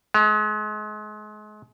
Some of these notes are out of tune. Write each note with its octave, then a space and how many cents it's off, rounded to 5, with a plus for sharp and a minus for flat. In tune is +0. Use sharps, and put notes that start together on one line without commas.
G#3 +35